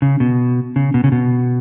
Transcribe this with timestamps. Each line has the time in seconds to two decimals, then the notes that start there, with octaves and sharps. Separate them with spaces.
0.02 C#3
0.20 B2
0.76 C#3
0.94 B2
1.04 C#3
1.12 B2